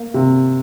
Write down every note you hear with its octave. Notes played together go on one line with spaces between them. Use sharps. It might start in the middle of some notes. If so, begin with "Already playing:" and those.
Already playing: A#3
C3